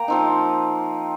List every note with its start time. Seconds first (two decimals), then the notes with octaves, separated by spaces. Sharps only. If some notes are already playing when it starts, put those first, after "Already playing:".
Already playing: A#3 G5 A#5
0.08 F3 C4 D#4